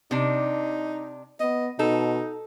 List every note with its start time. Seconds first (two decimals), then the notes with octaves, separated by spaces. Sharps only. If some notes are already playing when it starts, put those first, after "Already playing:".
0.11 C3 D4 D#4
1.40 B3 D#5
1.79 B2 D#4 A4